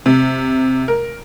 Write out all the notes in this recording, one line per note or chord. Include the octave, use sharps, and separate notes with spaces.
C3
A#4